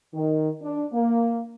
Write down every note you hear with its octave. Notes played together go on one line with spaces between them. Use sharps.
D#3
D4
A#3